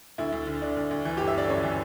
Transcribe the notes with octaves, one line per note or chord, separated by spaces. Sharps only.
D2 E4
D2
D3
D3 D4
D2
D2
E3
G1 G4
E5
G1 D5
F#2 C#5
E3